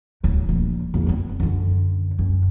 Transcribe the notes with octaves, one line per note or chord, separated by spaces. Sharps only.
D1 F#3
A#1
E2 A#3
B3 C4
F#2 D3
F#2